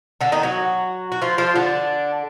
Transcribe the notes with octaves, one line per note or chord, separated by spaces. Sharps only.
D3 D4
D#3 D#4
F#3 F#4
F#4
F3 F4
F3 F4
D3 D4